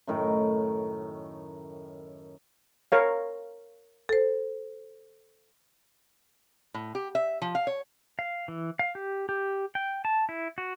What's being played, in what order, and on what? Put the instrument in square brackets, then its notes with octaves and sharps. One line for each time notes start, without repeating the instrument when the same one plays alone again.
[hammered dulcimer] F#2 A2 D#3 A#4
[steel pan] A#4 C#5 F5
[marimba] A4 C5
[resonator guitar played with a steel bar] A2
G4
E5
F3
F5
C#5
[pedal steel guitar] F5
E3
F5
G4
G4
G5
A5
E4
F#4